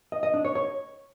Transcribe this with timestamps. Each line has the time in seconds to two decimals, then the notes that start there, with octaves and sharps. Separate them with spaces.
0.12 D#5
0.23 D#5
0.34 D4
0.45 C#5
0.55 C#5